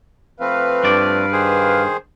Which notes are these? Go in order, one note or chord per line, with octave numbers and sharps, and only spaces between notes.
F3 A3 C4 B4 F5
G2 D5
D#3 G#4 C5